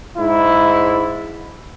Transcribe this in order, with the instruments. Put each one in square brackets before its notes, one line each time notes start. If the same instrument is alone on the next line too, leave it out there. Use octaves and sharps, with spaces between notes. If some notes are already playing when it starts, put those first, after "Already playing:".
[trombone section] G#2 E4